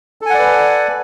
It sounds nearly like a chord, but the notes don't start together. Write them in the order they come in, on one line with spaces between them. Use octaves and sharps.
A4 G#5 F#5 D5 B4